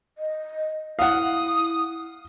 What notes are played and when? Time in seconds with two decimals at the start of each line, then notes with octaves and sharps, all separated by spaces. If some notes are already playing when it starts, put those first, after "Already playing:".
0.18 D#5
0.99 E4 F5 F#5 D#6